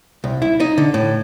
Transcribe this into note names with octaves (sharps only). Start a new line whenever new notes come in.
C2
E4
D#4
D3
A2